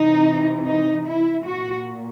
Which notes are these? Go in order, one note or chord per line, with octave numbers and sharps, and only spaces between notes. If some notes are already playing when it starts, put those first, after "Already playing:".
Already playing: C3 E3 D#4
D#4
E4
A#2 F#4